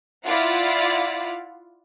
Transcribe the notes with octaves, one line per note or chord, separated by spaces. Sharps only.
E4 F4 D5 F5 F#5